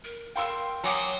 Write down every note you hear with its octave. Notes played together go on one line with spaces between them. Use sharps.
A#4
A#4 F5 G5 C6 E6
F#3 F#5 G#5 D6 D#6